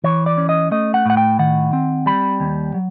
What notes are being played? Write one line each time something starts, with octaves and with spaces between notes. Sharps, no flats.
E3 C#5
D5
C#4
D#5
A3 D#5
F#5
A2 F#5
G5
D#3 F#5
C4
G3 B5
D#2
F#3